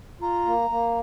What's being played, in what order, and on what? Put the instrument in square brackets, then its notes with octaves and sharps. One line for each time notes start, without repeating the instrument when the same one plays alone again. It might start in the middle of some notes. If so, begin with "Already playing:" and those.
[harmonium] F4 [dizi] A#5
[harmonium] A#3
A#3